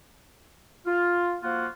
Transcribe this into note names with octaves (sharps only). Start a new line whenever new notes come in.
F4
F3 A#3 F4 F#4